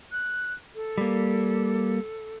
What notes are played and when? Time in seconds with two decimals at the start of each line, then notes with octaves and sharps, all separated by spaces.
0.12 F#6
0.75 A4
0.98 G3 A#3